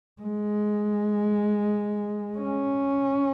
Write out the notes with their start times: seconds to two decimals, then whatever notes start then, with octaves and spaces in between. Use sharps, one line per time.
0.22 G#3
2.38 C#4